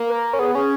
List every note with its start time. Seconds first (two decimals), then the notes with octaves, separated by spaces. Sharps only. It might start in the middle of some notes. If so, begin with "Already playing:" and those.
Already playing: A#3
0.09 B4
0.12 A#4
0.33 C#4
0.39 B3 G#4
0.55 C#4 G#4